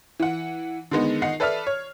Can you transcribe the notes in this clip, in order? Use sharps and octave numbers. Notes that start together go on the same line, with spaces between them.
E3 F#5
D3 D#3 G#3 B3 D#4
D#3 D#4 F#5 C7
A4 B4 D5 E5 A5 F6
C#5